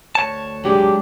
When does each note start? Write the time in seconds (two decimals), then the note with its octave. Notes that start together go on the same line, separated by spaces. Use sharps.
0.15 D2 C#5 A5
0.65 F#3 G#3 D4 G4